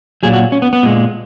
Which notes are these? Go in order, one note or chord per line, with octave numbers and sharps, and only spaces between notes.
A#2 F#3 G#4
F#4
C#4
B3
B3
A#2 G#3